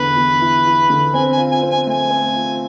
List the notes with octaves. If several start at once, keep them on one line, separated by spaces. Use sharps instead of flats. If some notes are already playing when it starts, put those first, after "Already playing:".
Already playing: E2 D3 B4
E2
E4
E4
D3
C4 G#5
G#5
F4
G#5
C4
G#5
A3 G#5
C4
F4